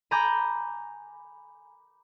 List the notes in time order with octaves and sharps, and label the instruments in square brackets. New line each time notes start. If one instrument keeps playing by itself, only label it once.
[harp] G#5 A#5 B5 D6 G6